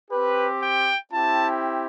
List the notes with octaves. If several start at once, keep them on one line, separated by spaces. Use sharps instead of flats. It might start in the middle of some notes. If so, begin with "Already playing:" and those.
C4 G4 B4
G5
C4 E4 G4 A5